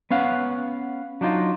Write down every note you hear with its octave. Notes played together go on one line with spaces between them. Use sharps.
B3 C#4 F5 F#5
F#3 D4 D#4 F4